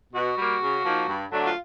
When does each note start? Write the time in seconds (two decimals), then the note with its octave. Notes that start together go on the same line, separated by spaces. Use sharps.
0.14 B2 F#4
0.38 G3 A#3
0.61 C#3
0.85 F3 A#3 D#4
1.08 G2
1.32 D3 F#3 A3 D4
1.44 F4